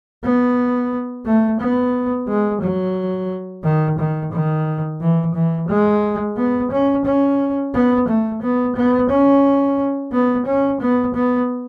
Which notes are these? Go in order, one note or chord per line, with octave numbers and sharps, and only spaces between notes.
B3
A3
B3
G#3
F#3
D#3
D#3
D#3
E3
E3
G#3
B3
C#4
C#4
B3
A3
B3
B3
C#4
B3
C#4
B3
B3